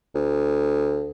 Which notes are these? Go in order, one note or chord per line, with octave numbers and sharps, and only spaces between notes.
D2